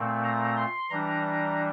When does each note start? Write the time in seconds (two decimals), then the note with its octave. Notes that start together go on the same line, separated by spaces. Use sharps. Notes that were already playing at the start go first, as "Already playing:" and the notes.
Already playing: A#2 A3 C4
0.23 A#5
0.56 C6
0.90 E3 G3 D4 A#5